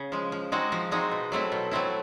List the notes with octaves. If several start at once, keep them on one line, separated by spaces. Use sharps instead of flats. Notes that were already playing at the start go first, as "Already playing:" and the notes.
Already playing: C#3
F3 G#3
F3
G#3 C4 D#4 F#4
F3
G#3 C4 D#4 F#4
B2
F#3 A3 C4 E4
B2
F#3 A3 C4 E4